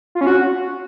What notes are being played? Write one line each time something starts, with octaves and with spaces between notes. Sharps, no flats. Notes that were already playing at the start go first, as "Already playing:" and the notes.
F4
C#4
F#4